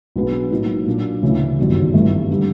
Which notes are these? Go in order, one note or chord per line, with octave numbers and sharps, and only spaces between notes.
B1 B2 G#3 B3 D4
A2 F#3 A#3 D#4
A#2 F#3 A#3 D4
D2 C#3 E3
G1 F#2 D#3 F#3
G#1 G2 E3 A3
D3 G3